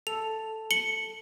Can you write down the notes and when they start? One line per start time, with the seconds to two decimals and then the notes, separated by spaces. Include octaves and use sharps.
0.07 A4 F7
0.71 C#7 F#7 G7